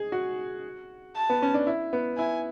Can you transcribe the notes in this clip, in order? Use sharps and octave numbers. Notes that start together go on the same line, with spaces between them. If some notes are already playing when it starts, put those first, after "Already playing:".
Already playing: G#4
F#4
A5
B3
C#4
D4
E4
B3
E4 G#5